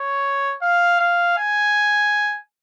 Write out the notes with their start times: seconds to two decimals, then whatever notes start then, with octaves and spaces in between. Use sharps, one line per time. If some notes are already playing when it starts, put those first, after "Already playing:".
Already playing: C#5
0.62 F5
1.00 F5
1.38 G#5